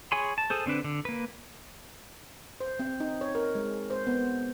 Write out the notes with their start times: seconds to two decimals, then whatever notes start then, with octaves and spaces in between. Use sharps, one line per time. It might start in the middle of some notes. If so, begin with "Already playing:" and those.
0.12 G#4 C#5 G#5 B5 C6
0.38 A5
0.50 G#4 A4 C5
0.66 D3 C4 D4 B4
0.84 D3
1.05 A#3 B4
2.60 C5
2.80 C4
3.00 D#4
3.21 C#5
3.35 A#4
3.55 G#3
3.90 C5
4.07 B3